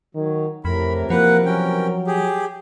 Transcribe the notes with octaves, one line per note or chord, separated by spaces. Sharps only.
D#3 F#3
F2 A2 C3 E3 A#4 B5
F3 A#3 B4 F#5
F#3 C#4 G5
G4 G#4